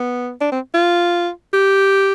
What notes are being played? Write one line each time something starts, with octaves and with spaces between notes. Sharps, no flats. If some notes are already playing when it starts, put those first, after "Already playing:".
Already playing: B3
D4
C4
F4
G4